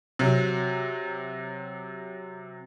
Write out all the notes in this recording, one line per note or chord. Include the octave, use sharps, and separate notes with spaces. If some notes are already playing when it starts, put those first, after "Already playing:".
C3 F#3